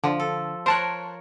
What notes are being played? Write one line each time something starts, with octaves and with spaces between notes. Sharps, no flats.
D3 F3
A4
A#4 C5 C#5 A5 F#6